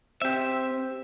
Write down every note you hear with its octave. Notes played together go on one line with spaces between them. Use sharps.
C4 G4 E5